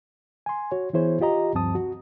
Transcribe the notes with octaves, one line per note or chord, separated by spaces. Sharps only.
G#5 C6
F#4 C#5
E3 B3 E4 G#4 C5 C#5
F4 G4 D#5 A#5
D2 G2 F3 C4 A5 D#6
F#4